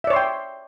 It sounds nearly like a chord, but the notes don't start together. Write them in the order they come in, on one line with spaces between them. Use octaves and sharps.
E5 D5 C#5 C6 G5